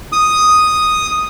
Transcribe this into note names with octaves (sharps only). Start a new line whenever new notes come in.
D#6